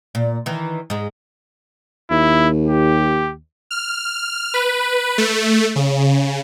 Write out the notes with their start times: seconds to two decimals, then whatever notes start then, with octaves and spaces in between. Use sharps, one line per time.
0.15 A#2
0.46 D#3 E3
0.90 G#2 G#3
2.11 D#2 E4
2.67 G4
3.71 F6
4.54 B4
5.18 A3
5.76 C#3